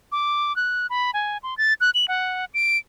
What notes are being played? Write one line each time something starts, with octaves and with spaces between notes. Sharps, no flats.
D6
F#6
B5
G#5
C6
A6
F#6
F#7
F#5
D7